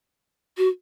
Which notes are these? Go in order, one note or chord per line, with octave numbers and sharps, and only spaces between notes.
F#4